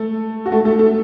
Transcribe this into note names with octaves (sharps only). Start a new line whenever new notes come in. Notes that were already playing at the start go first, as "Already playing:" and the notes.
Already playing: A3 A4
F#4
A3 A4
A3 A4
A3 A4